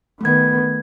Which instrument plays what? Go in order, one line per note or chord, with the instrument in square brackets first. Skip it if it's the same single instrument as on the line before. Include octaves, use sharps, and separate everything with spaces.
[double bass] D#3 B3 [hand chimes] A3 G#6